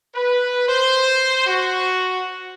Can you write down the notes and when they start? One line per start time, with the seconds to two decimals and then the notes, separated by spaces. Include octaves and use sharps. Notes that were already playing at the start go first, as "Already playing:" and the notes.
0.15 B4
0.68 C5
1.47 F#4